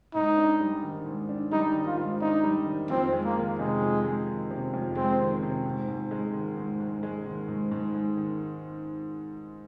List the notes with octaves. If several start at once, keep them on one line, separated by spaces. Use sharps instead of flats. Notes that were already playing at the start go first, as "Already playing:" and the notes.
G#2 D#4
D4
G3
D#3
G#2
D4
G3 D#4
D#3
F4
G#2
D4 D#4
G3
D#3
F2 C4
G#3
A#3
D#3
C3 G#3
F2
G#3
D#3
C3
F2
G#3 C4
D#3
C3
G#2
G#2
G#3
D#3
G#2
G#2
G#3
D#3
G#2
G#2
G#3
D#3